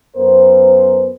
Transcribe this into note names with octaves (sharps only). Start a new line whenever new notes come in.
F#2 B3 A#4 C5